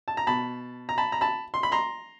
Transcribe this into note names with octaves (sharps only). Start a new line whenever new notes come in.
A5
A#5
B2 A5 B5
A#5
A5 B5
A#5
A5 B5
C6
B5
A#5 C6